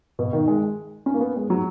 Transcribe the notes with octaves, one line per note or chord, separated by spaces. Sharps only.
B2
D#3
G#3
C#4
A#3
B3
G#3
F#3